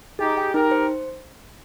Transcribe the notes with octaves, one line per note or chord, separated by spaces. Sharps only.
D#4 G4 G#4
G5
D#4 G4 A#4
C5